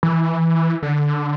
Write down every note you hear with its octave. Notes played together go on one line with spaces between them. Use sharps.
E3
D3